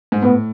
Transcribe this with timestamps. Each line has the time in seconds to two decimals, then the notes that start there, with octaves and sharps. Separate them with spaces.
0.12 G#2
0.23 A2 B3